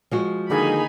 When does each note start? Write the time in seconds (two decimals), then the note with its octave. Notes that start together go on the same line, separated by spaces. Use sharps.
0.11 F3 G#3 F#4
0.50 D3 D#3 A#3 D#4 G#4 G#5 B5